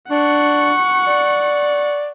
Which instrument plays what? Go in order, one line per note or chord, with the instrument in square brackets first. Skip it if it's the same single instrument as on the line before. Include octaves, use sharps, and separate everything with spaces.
[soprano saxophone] D4 [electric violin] F#5 C#6
[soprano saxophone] D5